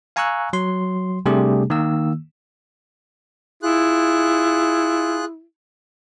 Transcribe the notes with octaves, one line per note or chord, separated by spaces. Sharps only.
F5 G#5 A#5 C#6 E6 F#6
F#3 C6
C3 G3 A3 D4 G4 G#4
D#3 A#3 E6
E4 F4 G#4 F#6